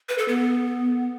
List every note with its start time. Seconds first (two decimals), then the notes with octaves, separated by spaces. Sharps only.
0.09 B4
0.18 A4
0.28 B3